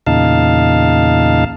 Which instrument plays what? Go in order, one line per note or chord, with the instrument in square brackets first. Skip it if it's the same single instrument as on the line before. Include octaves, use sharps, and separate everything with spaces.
[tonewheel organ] E2 A#2 C#3 D#4 F5 A5